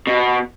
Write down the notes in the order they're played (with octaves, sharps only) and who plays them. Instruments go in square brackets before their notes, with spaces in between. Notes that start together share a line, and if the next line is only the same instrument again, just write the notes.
[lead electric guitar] B2